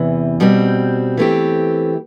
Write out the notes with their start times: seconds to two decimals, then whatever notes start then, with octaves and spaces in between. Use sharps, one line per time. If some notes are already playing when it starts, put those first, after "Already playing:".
Already playing: E2 C3 E3
0.40 B2 G3 C4
1.17 E3 A3 C4 G4